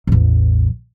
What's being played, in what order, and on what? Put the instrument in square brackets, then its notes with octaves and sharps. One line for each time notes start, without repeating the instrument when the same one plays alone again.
[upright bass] A1 E2